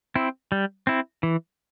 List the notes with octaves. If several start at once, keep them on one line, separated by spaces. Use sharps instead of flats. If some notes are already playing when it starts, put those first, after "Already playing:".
C4 E4
G3
C4 E4
E3